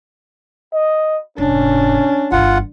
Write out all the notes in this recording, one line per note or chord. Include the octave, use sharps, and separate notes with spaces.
D#5
F1 G#2 C#4 D4
G1 D#3 F4 F#5